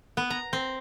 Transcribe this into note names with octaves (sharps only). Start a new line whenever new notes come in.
B3
A#5
C4